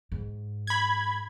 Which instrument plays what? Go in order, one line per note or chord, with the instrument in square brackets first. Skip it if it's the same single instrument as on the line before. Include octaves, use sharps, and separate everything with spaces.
[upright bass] G#2
[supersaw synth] B5 G#6